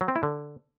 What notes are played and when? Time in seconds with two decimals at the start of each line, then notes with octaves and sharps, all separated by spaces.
0.01 F#3
0.08 C4
0.16 E4
0.23 D3